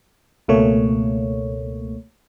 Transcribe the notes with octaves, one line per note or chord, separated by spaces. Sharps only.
C#2 B2 A3 A#3 C#5